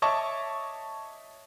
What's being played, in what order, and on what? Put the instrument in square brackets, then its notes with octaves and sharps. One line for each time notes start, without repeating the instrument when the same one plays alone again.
[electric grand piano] C#5 D#5 E5 A5 C#6 D6